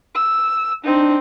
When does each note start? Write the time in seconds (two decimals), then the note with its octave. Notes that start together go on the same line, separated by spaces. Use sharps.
0.15 E6
0.84 C4 D4 D#4